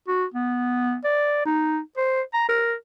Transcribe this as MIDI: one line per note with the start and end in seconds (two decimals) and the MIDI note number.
0.08 0.25 66
0.34 0.97 59
1.04 1.44 74
1.45 1.79 63
1.97 2.22 72
2.34 2.47 82
2.49 2.74 70